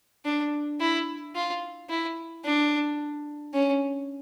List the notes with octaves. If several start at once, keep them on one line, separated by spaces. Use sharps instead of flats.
D4
E4
F4
E4
D4
C#4